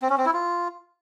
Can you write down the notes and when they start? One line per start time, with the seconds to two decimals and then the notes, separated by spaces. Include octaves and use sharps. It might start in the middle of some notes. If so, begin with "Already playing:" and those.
0.02 C4
0.10 C#4
0.18 C4
0.26 E4
0.33 F4